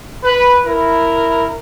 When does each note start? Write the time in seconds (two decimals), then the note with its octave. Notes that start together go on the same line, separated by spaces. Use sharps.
0.24 B4
0.65 E4 A#4